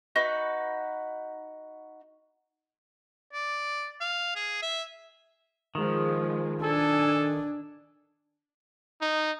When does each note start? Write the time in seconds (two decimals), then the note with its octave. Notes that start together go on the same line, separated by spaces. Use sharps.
0.16 D#4 F#4 B4
3.33 D5
4.00 F5
4.36 G#4
4.62 E5
5.75 D#3 F3 G#3
6.63 D4 A4 G#5
9.02 D#4